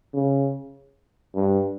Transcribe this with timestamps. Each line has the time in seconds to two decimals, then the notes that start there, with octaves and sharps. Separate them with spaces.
0.14 C#3
1.35 G2